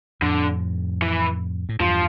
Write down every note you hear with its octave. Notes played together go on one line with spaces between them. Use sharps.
F2 A2 D3
E3
A2
E2 G2 F3